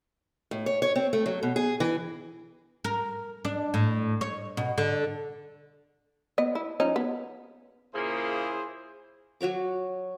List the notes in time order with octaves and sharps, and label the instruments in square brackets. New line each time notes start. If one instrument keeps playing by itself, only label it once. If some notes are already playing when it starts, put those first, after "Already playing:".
[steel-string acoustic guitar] A2
C#5
C#5
C4
A3
F#3
B2
G#4
E3
[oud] A#4
D4
A2
C#5
B2
D3
[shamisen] B3 D#5
E4
F3 C#4 D#4
B3
[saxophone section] A#2 C#3 A#3 [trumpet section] E4 G#4 C5
[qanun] F#3 F#4 C#5 D6